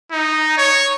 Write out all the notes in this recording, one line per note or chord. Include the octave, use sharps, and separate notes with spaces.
D#4
C#5